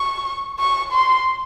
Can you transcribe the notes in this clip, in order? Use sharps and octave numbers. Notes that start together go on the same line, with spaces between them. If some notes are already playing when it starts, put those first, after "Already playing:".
Already playing: C#6
C#6
C6